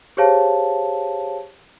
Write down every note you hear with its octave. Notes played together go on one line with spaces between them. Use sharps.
G4 G#4 C5 C#5 F5 A5